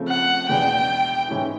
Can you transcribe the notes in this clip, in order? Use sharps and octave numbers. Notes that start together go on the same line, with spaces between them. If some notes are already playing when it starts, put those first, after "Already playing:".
Already playing: C#3 F3 A3 C4
F#5
E2 B2 G#3 B3 D4 G5
G#2 E3 G#3 C#4 E4